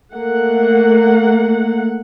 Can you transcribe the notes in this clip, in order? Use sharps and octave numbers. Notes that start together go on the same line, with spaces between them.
A3 A#3 F#5